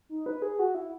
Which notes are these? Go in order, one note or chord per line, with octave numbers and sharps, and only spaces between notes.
D#4
B4
G#4
F#4
E4